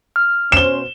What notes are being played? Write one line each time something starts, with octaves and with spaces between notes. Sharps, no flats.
F6
B2 C#4 C5 E7 G7